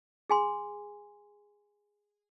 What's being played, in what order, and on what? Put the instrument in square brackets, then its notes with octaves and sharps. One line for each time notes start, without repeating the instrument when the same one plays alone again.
[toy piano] G#4 G#5 C6